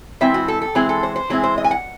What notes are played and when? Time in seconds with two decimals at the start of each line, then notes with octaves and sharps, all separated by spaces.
0.21 E3 G#3 C4 E4 E5
0.34 F#4
0.48 A4
0.62 A4
0.75 E3 G#3 C4 E4 G#4
0.89 A4
1.03 C5
1.16 C5
1.30 E3 G#3 C4 E4 G#4
1.43 C5
1.58 D#5
1.64 G#5
1.71 F#5